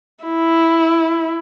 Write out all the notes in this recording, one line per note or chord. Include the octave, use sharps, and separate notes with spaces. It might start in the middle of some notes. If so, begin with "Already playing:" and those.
E4